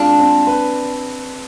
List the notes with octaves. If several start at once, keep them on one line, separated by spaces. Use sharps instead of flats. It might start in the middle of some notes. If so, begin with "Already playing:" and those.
Already playing: G#3 C4 D4 F4
C4
B4